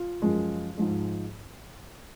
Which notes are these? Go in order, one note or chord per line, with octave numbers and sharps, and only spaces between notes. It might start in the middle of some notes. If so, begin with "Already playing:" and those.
Already playing: F4
F#2 F3 G#3
G#2 F3 G#3